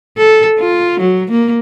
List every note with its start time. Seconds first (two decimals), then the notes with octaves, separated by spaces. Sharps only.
0.18 A4
0.59 F4
1.00 F#3
1.31 A#3